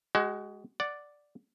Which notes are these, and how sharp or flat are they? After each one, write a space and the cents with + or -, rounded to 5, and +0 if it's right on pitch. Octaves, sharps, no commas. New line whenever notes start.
G#3 +0 F#4 +35
D5 +0 F#5 +0